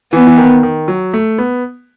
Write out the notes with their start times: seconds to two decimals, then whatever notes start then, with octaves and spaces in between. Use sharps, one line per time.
0.12 E3 B3
0.27 E3
0.38 D#3
0.63 D#3
0.88 F#3
1.14 A3
1.38 B3